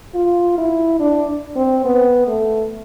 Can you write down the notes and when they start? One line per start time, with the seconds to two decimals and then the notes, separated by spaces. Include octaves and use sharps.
0.15 F4
0.58 E4
1.00 D4
1.56 C4
1.85 B3
2.28 A3